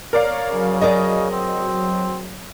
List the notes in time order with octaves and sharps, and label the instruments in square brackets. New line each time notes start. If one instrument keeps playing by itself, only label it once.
[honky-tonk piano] A#4 D5 F5 [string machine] C#5
[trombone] C#3 [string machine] F#3
[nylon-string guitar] G#4 A#4 D5 [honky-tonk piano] D#5
[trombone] C4